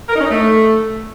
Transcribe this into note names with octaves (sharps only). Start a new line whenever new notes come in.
A#4
D#4
C#4
D#4
A3